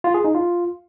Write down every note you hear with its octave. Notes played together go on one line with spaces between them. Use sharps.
F4
G#4
D#4
F4